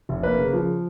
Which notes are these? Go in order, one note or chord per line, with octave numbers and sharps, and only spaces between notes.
F1
A#3 B4
C#3
F3